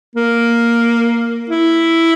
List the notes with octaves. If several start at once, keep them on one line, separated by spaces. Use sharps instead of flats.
A#3
E4